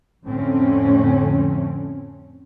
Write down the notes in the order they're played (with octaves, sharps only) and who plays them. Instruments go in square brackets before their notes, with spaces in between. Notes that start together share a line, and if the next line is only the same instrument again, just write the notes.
[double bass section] F2 A2 D3 A3 C4 C#4